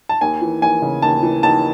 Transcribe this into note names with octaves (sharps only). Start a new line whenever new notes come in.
A5
D#2 G#5
E3
D#2 G#5
C#3
D#2 A5
E3
D#2 A5